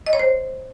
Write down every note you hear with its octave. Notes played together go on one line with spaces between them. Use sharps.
D#5
C#5
C5